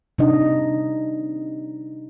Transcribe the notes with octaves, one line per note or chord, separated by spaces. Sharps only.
C3 D4 D#4 D#5